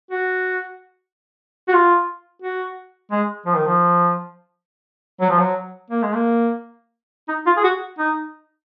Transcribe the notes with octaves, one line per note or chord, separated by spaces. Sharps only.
F#4
F#4
F4
F#4
G#3
F3
D#3
F3
F#3
F3
F#3
A#3
G#3
A#3
D#4
F4
G#4
F#4
D#4